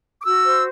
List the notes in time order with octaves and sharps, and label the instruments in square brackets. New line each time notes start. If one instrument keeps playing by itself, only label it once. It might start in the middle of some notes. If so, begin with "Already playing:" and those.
[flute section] D6
F#4 E6
C5